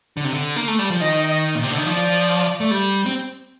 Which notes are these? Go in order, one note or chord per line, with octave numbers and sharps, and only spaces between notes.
D3
C3
D3
A#3
A3
G3
F3
D#3 D#5
A#2
C3
D3
D#3
F3 D5
A3
G3
C4